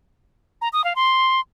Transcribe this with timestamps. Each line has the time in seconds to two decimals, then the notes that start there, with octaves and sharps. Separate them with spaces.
0.61 A#5
0.73 D#6
0.84 F5
0.95 C6